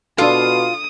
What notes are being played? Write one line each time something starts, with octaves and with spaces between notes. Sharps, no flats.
B2 D4 F4 A4 D#6